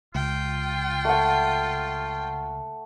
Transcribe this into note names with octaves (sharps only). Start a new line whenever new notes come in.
C#2 F4 G5
A3 F#5